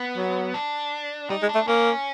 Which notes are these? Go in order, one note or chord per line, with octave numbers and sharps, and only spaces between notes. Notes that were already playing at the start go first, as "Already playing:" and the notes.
Already playing: B3
F#3
D4
G3 D#4
G#3
D4
A3
A#3 C#4